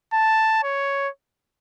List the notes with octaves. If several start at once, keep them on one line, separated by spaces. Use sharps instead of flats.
A5
C#5